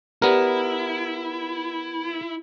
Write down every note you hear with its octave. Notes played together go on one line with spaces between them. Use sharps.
B3 E4 G4 A#4 D5